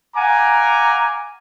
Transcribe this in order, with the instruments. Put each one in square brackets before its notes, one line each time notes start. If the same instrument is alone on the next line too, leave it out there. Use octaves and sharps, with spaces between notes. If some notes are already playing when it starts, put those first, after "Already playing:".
[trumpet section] F5 F#5 G#5 A#5 D6